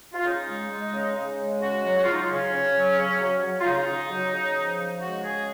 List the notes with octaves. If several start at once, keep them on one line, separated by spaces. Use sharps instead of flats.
F4
C#3 D#4
G#3
G#3
C#3
C#3
G#3
C#3 F#4
F#3
F#4
F#3 F4
D#4
F4
C#3 C#4
C#3
F#3
C#3
F#3
F#3
F4
C#3 D#4
C#3
F#3
C#3
F3
C#3
G#3 F#4
C#3 G#4